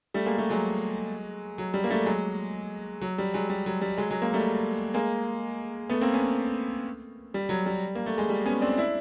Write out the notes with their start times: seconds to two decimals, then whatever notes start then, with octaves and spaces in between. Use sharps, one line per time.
0.14 G3 A3
0.26 G#3 A#3
0.38 G3 A3
0.50 F#3 G#3
1.58 F#3
1.74 G3
1.84 A#3
1.90 G3 A3
2.06 F#3 G#3
3.02 F#3
3.18 G3
3.34 F#3 G#3
3.50 G3
3.66 F#3
3.81 G3
3.97 F#3 G#3
4.10 F#3 G#3
4.22 G#3 A#3
4.33 G3 A3
4.94 G#3 A#3
5.89 A3 B3
6.01 A#3 C4
6.13 B3 C#4
7.34 G3
7.49 F#3
7.66 G3
7.95 A#3
8.06 A3
8.18 G#3
8.30 G3
8.45 B3 C#4
8.61 C4 D4
8.77 D4 E4